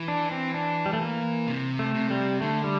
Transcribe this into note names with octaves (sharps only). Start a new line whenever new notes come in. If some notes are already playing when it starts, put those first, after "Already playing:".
Already playing: E3
D4
C4
D4
G3
A3
A#3
C3
A3
C3
G3
D3 A3
G3